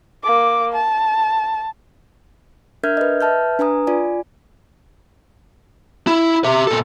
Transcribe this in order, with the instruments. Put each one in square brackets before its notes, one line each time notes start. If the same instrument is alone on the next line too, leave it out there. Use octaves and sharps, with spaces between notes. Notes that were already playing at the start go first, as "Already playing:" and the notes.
[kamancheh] A#3 D6
A5
[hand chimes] D4 A#4 E5 F6 G6 G#6
B4 D#5
B4 E5 A5 F6 G6
D4 B4 G#5 A#5 D#6
F4 D5 G#5
[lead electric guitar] E4
G4 E5
A#2 A4